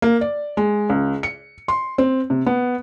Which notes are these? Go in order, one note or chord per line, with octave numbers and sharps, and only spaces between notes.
A#3
D5
G#3
C#2
C#7
C6
C4
C3
B3